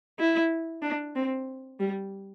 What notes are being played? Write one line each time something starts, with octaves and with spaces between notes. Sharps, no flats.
E4
D4
C4
G3